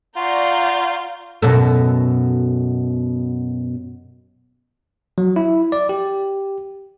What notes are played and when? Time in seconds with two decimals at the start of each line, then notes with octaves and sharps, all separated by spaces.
0.16 F4 D5 F5 F#5 A#5 C#6 G6
1.42 F#2 B2 A4
5.18 F#3
5.36 E4
5.72 D5
5.89 G4